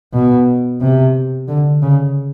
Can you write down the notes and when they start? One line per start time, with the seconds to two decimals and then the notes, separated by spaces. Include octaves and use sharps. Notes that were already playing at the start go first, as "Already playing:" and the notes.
0.14 B2
0.81 C3
1.48 D3
1.82 C#3